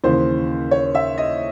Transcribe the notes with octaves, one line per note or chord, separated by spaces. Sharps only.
D#2 C#3 E3 C5
C#5
E5
D#5